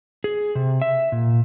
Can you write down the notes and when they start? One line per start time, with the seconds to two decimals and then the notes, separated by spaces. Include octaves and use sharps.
0.24 G#4
0.55 C3
0.82 E5
1.12 A#2